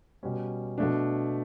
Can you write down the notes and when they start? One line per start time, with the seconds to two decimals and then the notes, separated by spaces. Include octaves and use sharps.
0.23 B2 G3 C#4
0.78 B2 A3 D4